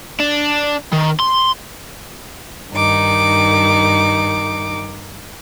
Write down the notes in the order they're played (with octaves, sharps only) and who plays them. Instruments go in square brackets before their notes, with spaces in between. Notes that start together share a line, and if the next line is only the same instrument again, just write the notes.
[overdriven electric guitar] D4
D#3
C6
[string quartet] G2 D#3 D#4 D6